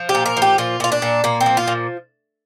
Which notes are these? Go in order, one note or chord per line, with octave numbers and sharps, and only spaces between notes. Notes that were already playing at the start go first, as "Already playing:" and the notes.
Already playing: F3
G4
A#2
A#4
F3
G4
A#2 F4
A#2 F4
D4
A#2
A#2 A#3
C4
F3
F4
A#2